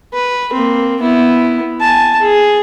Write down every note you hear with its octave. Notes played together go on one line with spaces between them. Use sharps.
B4
A#3 C4
B3 E4
G#5 A5
G#4